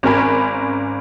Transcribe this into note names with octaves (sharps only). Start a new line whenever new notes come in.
G#1 C#4 A#4 G#5 B5